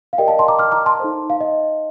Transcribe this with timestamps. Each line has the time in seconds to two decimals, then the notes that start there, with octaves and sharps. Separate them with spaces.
0.13 F5
0.18 G4 A#4 D5 D#5 G5
0.28 F5 A5
0.39 A5 C6
0.48 A#5 D6
0.59 D6 F6
0.72 A#5 D6
0.86 A5 C6
1.00 D#4 A4 C5
1.30 F5
1.41 D#5